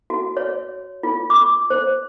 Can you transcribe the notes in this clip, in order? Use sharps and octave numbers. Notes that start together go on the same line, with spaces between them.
F#4
C#5
F4
D6
C5